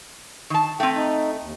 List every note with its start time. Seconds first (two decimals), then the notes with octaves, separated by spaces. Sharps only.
0.50 D#3 A5
0.80 A3 C4 G5
0.96 D#4
1.41 D#2